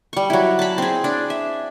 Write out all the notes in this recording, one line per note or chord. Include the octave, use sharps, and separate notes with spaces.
G3 C#6
F#3 E4
A5 B5
C4 G#4
D4
E5